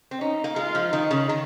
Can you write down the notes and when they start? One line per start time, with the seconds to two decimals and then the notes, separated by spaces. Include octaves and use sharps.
0.11 C4
0.21 C#4 D#4
0.44 A#3
0.56 G#3 F4
0.75 F3
0.92 D#3 D#4
1.11 C#3
1.29 D#3